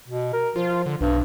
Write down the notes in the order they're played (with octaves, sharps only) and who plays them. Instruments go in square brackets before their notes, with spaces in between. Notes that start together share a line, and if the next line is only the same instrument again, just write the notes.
[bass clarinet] B2
A#4
[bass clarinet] F3 [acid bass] F4
[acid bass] D3
[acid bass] B1 [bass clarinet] G2